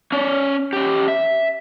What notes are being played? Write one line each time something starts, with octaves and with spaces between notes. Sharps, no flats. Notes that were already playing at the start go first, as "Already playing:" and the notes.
C#4 D5
C#4 G4
E5